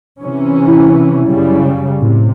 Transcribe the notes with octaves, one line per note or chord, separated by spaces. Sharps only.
C3 E3 C#4
E4
F#2 C#3 G3
A2 C3